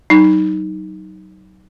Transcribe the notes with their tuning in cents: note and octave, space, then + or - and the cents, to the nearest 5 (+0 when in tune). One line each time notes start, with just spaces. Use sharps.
F#3 +30 D#4 +0